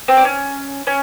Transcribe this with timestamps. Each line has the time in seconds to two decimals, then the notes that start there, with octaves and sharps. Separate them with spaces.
0.08 C4
0.17 D4
0.25 C#4
0.87 C#4